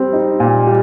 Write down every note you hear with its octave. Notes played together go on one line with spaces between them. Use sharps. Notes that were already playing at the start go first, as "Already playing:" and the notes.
Already playing: G3 C4
D#4
A#2
G3